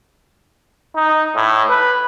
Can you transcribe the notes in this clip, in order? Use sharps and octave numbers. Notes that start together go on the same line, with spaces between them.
D#4
A2
B4